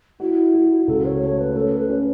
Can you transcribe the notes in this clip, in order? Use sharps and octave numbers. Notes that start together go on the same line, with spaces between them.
E4 F#4
F#4
C#2 A4
C#5
A3 C#5
B4
C#4 A4
B4
C#4